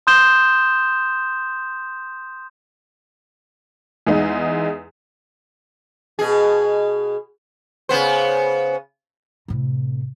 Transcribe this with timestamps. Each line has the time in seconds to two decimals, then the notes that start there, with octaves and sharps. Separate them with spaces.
0.07 C6 D#6 G6 E7 G7
4.07 E2 G#3 D#4
6.19 B2 G#4
7.89 C#3 B3 C5
9.48 A2 C3